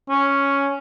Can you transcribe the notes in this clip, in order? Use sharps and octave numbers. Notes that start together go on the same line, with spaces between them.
C#4